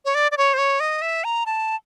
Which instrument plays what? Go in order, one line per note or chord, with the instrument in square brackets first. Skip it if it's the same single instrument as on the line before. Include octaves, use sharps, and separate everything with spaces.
[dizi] C#5
D5
D5
C#5
C5
C#5
D#5
E5
A#5
A5